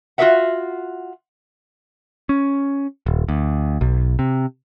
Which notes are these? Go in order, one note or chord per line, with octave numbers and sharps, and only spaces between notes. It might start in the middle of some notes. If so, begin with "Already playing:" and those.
F4 F#4 A4 B4 E5 F#5
C#4
D#1
D2
B1
C3